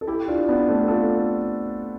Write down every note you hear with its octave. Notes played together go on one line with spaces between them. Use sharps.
A4
E4 G4
D4 F4
B3 D4
A3 C4
F4 A4